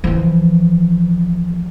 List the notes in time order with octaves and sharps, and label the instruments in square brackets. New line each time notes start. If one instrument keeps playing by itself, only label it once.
[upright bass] E3 F3